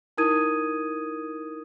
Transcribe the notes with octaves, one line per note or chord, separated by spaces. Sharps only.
D#4 E4 A#4 D#6 G#6 D#7